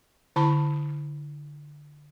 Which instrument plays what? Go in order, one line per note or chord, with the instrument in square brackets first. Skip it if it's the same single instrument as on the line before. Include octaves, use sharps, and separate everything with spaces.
[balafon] D3 E4 A5 B5